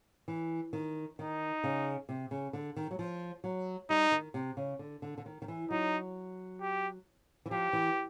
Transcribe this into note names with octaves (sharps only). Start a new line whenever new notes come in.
E3
D#3
D#3 D#4
C#3
C3
C#3
D3
D#3
F#3
F3
F#3
G3 D#4
D#3
C3
C#3
D3
D3
D3
D#3
D#3
E3
F#3 D#4
G4
E3
F3 G4
E3